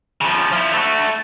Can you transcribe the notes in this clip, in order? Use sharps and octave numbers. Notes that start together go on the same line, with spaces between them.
C#3 F3
F3 E4
A3 F#4